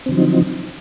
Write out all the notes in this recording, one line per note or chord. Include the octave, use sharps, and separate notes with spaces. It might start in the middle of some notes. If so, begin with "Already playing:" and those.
D3 F3 F#3 C4 D#4